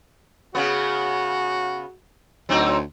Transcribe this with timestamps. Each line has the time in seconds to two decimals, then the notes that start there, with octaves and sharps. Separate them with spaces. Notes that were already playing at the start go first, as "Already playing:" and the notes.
0.55 C#3 B3 F#4
2.49 D2 F#3 C4 D#4